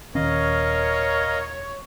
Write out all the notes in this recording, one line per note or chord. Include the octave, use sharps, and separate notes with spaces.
D#1 D#3 C#4 A#4 C#5 D#5 F5